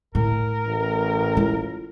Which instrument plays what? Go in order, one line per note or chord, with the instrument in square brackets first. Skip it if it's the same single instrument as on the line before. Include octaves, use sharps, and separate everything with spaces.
[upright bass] A2 [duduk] A#4
[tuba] A1
[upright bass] E4 F4